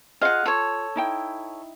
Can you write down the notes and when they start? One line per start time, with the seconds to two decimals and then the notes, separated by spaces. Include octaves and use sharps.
0.21 F4 G#4 D#5 F5 F#5
0.46 F4 A4 C#5
0.96 D#4 E4 G5